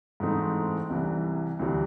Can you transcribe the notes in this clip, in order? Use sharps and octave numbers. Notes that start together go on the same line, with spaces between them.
G#2 E3 A3 C4 D#4
C2 C3 E3
D2 C3 E3 G3